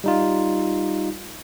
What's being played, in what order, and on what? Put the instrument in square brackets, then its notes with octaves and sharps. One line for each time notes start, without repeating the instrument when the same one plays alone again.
[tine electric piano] G3 D#4 F4